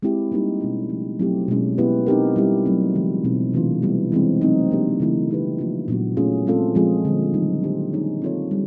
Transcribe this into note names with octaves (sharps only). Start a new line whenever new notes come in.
G#3 C4 E4 G4
G3 A#3 D#4 G4
B2 G#3 C#4
C#3 F3 A3
F#3 A3 C4 E4 G4
B2 G#3 C#4
B3 E4 G4 B4
C4 D#4 G4 A#4
G3 C4 E4 G4
F#3 A3 C4
C#3 E3 G#3
B2 G#3 C4 D#4
C3 E3 A3 D4 F4
G3 B3 E4
E3 G#3 C4
F#3 A3 C4 D#4
A#3 D4 G4
C#3 E3 A3 C4 E4
C4 D#4 G4 B4
F3 A#3 D4 F4
A#2 F#3 B3 D4 F#4
A3 C#4 F4 G#4
G#3 C4 F4 A4
F3 G#3 C4 F4 G#4
D3 G3 A#3
D#3 F#3 A#3 D#4
F3 A#3 D4 G4 C5
F3 A#3 D#4 G#4 C#5
C4 F4 A4 C#5
G3